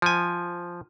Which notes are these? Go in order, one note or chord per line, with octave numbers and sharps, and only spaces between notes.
F3 G#5